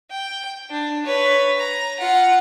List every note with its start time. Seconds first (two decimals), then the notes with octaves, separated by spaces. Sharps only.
0.11 G5
0.70 D4
1.04 B4 C#5
1.58 A#5
1.99 F4 F#5